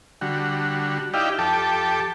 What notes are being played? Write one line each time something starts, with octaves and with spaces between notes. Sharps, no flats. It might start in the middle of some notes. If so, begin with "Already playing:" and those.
D3 G3 F#4
D#4 E4 G4 D5 F5 G5
F2 G4 A4 G5 A5 D6